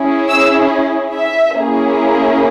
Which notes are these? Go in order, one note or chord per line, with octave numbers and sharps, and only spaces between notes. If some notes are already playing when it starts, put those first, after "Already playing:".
Already playing: C#4 E4 G#4
E6
E5
A#3 C#4 E4 G#4